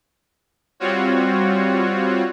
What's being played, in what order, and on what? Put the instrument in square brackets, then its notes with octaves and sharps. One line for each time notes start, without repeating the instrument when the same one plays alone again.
[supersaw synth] G3 C4 F4 F#4 C#5